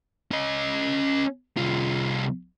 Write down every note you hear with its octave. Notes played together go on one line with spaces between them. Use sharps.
C#4 D#5
C2 F4